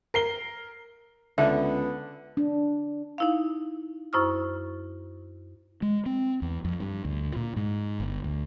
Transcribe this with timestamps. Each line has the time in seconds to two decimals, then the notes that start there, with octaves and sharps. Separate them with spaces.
0.14 A#4 C7 G7
1.38 C#2 D3 B3 E5
2.37 D4
3.18 D#4 E4 F5
4.13 F#2 E4 C5 C#6 D#6 F6
5.82 G#3
6.06 C4
6.42 E2
6.65 F2
6.80 G2
7.05 D2
7.36 A#2
7.56 G#2
8.00 G1
8.24 D2